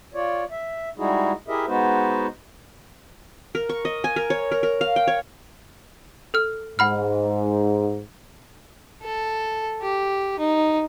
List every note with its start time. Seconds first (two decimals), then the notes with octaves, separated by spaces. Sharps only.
0.14 F4 C#5 D5
0.51 E5
0.98 G3 G#3 D#4 E4 F#4 G#4
1.48 E4 G4 G#4 A#4 D#5 E5
1.67 G#3 B3 D#4 F#4 B4 C5
3.55 A#4
3.69 C#6
3.85 D#5
4.04 G#5
4.16 A#4
4.30 C#5
4.52 A#4
4.63 A#4
4.81 F5
4.96 G5
5.08 C#5
6.34 A4 F6
6.79 G#2 F#5 B5 F6
9.03 A4
9.82 G4
10.39 D#4